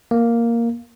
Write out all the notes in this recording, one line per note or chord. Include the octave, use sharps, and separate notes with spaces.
A#3